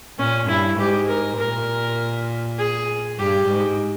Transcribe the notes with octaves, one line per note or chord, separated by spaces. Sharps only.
A#2 C#4
G2 E4
G#2 G4
A#4
A#2 A#4
G#4
G2 G4
G#2